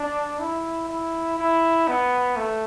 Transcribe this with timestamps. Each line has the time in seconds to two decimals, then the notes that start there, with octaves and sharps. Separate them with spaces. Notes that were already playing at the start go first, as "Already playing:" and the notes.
Already playing: D4
0.39 E4
0.88 E4
1.39 E4
1.88 B3
2.37 A3